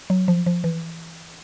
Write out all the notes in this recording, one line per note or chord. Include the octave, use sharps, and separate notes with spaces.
F#3
F3
F3
E3